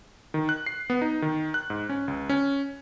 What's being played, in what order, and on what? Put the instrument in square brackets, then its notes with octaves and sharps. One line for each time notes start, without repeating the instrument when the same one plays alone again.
[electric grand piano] D#3
F#6
C7
B3
D#4
D#3
F#6
G#2
C#4
C#2
C#4